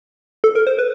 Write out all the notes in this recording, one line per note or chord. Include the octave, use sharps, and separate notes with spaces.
A4
A#4
C5
B4